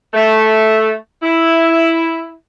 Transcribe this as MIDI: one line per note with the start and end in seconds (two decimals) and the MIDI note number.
0.13 0.94 57
1.23 2.32 64